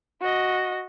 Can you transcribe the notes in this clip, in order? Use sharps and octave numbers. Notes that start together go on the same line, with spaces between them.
F#4 D#5